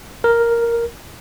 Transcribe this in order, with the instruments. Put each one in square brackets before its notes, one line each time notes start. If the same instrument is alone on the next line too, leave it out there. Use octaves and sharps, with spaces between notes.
[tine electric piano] A#4